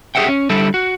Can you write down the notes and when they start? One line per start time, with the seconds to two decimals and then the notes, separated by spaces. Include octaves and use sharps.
0.15 G4 G#4 B4 E5 F#5 G5
0.28 C#4
0.50 D3 G3 E4 G4 A4
0.74 F#4